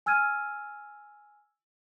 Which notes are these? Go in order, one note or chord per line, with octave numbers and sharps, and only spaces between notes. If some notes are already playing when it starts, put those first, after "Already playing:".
G#5 E6 F6 G#6 D#7